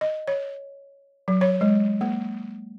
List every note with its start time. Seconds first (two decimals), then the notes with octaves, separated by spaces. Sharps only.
0.01 D#5
0.28 C#5
1.28 F#3
1.41 C#5
1.61 G#3
2.01 A#3